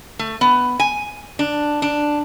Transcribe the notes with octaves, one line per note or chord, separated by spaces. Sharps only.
A3
B3
G#5
D4
D4